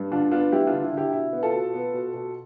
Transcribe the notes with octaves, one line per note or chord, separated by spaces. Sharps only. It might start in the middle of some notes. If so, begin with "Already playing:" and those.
Already playing: G2
D3 D4 F4
B3 D4 F4
G3 E4 G4
D4 F4
D3
E4
D3 E4 G4
B2 E4
B3
F4 A4
B2
B3
B2
B2